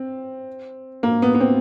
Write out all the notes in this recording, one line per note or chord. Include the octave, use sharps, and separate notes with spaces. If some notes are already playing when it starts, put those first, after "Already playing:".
Already playing: C4
A#3
B3
B3
C4